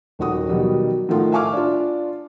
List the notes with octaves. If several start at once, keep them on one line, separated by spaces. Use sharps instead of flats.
D#1 D#3 F#4 D#6
B2 D#3 F#3 G3
A2 D#3 A3 F4 F#5
E5 F5 G#5 C#6 D6 F6
D4 F4